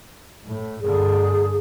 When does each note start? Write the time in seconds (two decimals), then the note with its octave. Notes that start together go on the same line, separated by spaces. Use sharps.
0.45 A2
0.81 G2 D3 G#4